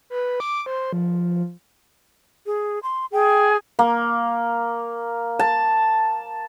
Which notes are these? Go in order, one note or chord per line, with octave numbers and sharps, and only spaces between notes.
B4
D6
C5
F3
G#4
C6
G#4 G5
A#3
A5